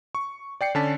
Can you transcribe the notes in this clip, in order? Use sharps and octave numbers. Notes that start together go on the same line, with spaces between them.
C#6
D5 G5 C7 C#7
D3 C#4 D5 A5 B6